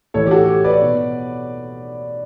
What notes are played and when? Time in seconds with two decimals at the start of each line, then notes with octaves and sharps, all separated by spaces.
0.14 A2 E3 A4 C#5
0.26 G4
0.31 F#4 A4
0.48 G4
0.64 B4 D5
0.81 B2